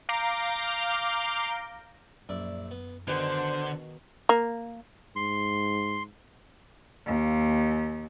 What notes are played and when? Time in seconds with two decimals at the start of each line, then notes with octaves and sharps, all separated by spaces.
0.09 F5 A#5 D6 G6
2.29 A#1 F#2 E4 D5
2.71 B3
3.08 B2 D3 D#3 G#4 C5
4.29 A#3
5.16 G#2 C6
7.06 D#2